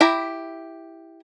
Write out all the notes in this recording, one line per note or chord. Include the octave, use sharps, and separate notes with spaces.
E4 G4 A#5